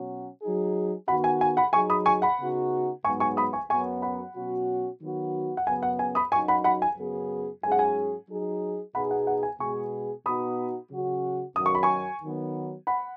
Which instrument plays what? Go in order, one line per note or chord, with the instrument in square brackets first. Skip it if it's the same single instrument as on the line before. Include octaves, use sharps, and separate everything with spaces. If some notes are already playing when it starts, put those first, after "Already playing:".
Already playing: [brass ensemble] B2 F#3 C#4 F#4
F#3 D#4 G#4
[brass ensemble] D#3 B3 F#4 [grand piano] F#5 B5
[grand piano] G#5
G#5
F#5 B5
[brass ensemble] F#3 D#4 G#4 [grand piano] G#5 C#6
[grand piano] B5 D#6
G#5 C#6
F#5 B5
[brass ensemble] C#3 B3 D#4 F#4
[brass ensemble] G#2 F#3 B3 [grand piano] G#5 C#6
[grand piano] G#5 C#6
B5 D#6
G#5 C#6
[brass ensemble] F#2 F#3 B3 [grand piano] G#5 C#6
[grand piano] F#5 B5
[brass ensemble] B2 F#3 C#4 F#4
D#3 F#3 B3 F#4
[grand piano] F#5
[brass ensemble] F#2 C#3 B3 [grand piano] G#5
[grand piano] F#5
G#5
B5 D#6
[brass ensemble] F#2 F#3 D#4 F#4 [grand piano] G#5 C#6
[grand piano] F#5 B5
F#5 B5
G#5
[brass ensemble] F#2 C#3 B3 G#4
[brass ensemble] G#2 F#3 C#4 G#4 [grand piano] G#5
[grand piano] F#5
G#5
[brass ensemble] F#3 D#4 G#4
[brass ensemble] B2 B3 D#4 G#4 [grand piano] F#5 B5
[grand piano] F#5
F#5
G#5
[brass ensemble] B2 G#3 B3 G#4 [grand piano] G#5 C#6
[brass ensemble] B2 B3 D#4 F#4 [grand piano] B5 D#6
[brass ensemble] C#3 F#3 C#4 F#4
[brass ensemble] F#2 D#3 F#3 [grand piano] D#6
[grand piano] C#6
B5
G#5 C#6
[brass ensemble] D#3 F#3 B3
[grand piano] F#5 B5